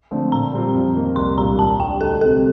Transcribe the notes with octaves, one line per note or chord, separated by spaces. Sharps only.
D3 F3 A3 C4
A#2 A#5
G3 C4 F4
F2
D#3 A#3
C2 C6
A#2 G3 D4 F4 A#5
D#2 A5
D#3 G3 D4 G5
D2 A4
C3 G3 C4 D#4 A4